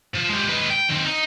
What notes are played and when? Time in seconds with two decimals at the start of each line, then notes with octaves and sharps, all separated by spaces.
0.14 F3
0.29 G#3 G4
0.49 G#3 B4
0.70 G5
0.89 D#2 C4
1.05 D#4